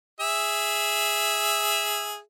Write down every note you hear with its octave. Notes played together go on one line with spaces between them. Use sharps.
G#4 E5